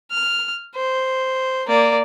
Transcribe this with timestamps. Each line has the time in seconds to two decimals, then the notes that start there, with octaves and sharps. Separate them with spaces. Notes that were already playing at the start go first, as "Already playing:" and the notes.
0.11 F6
0.75 C5
1.67 A#3 D5